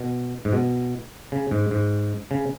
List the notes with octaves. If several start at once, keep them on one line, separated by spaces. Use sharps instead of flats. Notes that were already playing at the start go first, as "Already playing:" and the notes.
Already playing: B2
G#2
B2
C#3
G#2
G#2
C#3